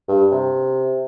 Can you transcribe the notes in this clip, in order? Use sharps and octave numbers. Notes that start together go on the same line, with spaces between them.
G2
C3